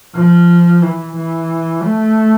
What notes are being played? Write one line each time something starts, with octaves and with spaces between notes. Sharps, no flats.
F3
E3
E3
A3